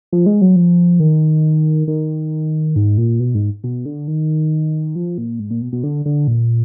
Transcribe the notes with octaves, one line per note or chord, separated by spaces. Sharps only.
F3
G#3
F#3
F3
D#3
D#3
G#2
A#2
B2
G#2
B2
D3
D#3
F3
A#2
G#2
A#2
B2
B2
D3
D3
A#2